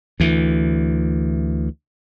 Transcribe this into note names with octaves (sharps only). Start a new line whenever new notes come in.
D2 E3